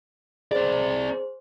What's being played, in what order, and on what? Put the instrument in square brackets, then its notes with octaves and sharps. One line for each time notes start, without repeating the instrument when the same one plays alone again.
[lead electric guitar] C4 D5 [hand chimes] G#4 C5